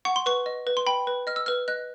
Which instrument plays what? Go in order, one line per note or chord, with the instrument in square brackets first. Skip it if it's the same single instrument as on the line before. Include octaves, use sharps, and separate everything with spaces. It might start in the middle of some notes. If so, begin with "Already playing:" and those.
[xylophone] F#5 C#6
C6
B4 C#6
D#5
B4
C6
G5 B5
B4
D#5 F6
E6
B4 F6
D#5 F#6